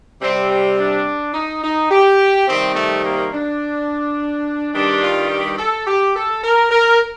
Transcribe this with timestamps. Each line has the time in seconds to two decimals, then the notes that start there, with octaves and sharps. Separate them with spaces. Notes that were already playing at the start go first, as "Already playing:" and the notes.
0.21 C3 G3 C4
0.50 C4
0.78 D4
1.34 D#4
1.63 D#4
1.90 G4
2.47 C3 D#3 G3 C4
2.75 A3
3.05 A#3
3.33 D4
4.73 G2 D#3 G3 D4
5.03 F4
5.30 G4
5.58 A4
5.87 G4
6.16 A4
6.44 A#4
6.71 A#4